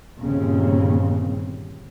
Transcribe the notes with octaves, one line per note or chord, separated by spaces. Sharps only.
G1 D#2 A#2 C#3 C4